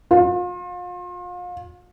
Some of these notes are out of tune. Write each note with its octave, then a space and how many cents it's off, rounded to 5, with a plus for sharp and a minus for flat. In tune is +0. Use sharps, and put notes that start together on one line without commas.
F4 +35